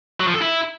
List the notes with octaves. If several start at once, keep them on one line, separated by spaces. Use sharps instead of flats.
F#3
F3
A4
E4